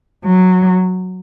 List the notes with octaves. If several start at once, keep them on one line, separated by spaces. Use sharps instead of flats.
F#3